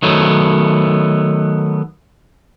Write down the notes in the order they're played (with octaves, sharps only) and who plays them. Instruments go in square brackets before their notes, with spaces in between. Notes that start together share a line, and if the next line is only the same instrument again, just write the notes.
[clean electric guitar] D#3 F#3 A3 B3